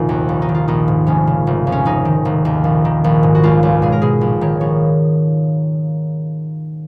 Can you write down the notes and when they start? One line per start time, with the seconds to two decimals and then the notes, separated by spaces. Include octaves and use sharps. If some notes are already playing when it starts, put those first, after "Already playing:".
Already playing: F1 A#1 A#2 D#3 D#4 F4
0.09 D#2
0.29 A#1
0.42 D#4
0.49 D#3
0.55 F4
0.68 A#1 D#4
0.88 G#2
1.07 F1 C#4
1.27 C#3
1.47 F1
1.67 F2
1.72 C#4
1.85 F1 D#4
2.05 D#3
2.25 F1
2.45 D#2
2.64 A#1
2.85 D#3
3.04 A#1
3.23 G#2
3.35 F#4
3.43 C#2 F4
3.63 C#2
3.82 B2 G#4
3.92 A#4
4.02 B2 G#4
4.21 A#1
4.41 D#3 C#5
4.61 A#1 C#5